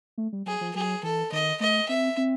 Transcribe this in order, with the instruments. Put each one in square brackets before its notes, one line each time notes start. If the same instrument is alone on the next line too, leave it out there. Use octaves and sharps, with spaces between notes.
[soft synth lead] A3
G3
[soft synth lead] F#3 [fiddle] G#4
[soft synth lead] F3
[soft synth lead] F#3 [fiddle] G#4
[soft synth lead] E3 [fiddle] A4
[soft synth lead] D#3 [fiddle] D#5
[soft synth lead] A3 [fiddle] D#5
[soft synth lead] C4 [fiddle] E5
[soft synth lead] C4